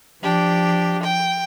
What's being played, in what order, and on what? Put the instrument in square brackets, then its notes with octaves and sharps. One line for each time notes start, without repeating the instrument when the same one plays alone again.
[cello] F3 [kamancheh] D4 G4
[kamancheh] G5